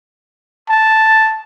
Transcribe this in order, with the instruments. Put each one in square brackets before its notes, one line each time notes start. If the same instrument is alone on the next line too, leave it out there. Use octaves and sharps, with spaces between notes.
[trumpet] A5